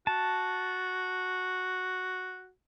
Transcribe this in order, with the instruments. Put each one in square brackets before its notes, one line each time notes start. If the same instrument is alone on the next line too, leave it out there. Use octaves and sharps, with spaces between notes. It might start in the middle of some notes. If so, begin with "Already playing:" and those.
[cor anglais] F#4 [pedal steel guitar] A5